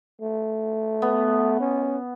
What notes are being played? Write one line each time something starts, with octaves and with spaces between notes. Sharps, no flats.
A3
B3
C#4